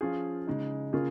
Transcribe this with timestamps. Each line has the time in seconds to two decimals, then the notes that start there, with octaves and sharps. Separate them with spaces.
0.01 F3 C#4 F4 G#4
0.47 C#3 G#3 D#4
0.93 C#3 A#3 C#4 F4 G#4